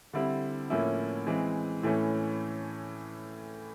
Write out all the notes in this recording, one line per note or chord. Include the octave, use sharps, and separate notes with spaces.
D3 G3 C4 E4
A2 F3 A#3 C#4 E4
E3 G#3 C4
A2 E3 A3 C#4